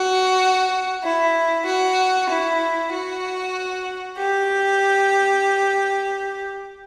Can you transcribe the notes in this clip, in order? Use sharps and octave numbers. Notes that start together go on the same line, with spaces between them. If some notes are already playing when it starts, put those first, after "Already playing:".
Already playing: F#4
E4
F#4
E4
F#4
G4